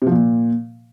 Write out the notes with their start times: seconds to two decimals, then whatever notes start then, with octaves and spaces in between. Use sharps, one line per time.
0.02 C3
0.07 F3
0.12 A#2